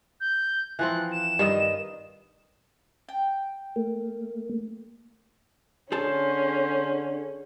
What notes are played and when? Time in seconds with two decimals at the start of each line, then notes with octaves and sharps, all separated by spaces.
0.21 G6
0.79 E3 F3 C4 F#6
1.12 E7
1.39 G2 D#3 D#5
3.09 G5
3.76 A3 A#3
5.92 D3 C#4 G#4 C5 A5